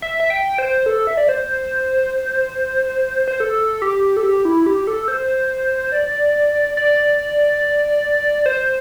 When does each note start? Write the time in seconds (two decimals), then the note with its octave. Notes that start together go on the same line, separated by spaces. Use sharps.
0.02 E5
0.20 E5
0.30 G5
0.58 C5
0.86 A4
1.07 E5
1.17 D5
1.29 C5
3.28 C5
3.40 A4
3.82 G4
4.17 A4
4.23 G4
4.45 E4
4.66 G4
4.87 A4
5.08 C5
5.92 D5
6.77 D5
8.46 C5